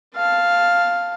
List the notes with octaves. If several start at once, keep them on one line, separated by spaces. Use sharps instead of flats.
F5 A5